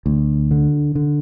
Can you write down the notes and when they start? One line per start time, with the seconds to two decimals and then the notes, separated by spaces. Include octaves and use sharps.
0.06 D2
0.51 D3
0.95 D3